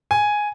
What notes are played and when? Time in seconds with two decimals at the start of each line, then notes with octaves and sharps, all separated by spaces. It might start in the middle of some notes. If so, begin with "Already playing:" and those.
0.11 G#5